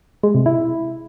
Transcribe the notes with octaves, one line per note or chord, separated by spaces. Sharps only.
G#3
C3
E4